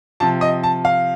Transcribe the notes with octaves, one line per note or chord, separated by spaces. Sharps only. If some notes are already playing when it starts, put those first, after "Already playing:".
C3 F3 A5
D#5
A5
F5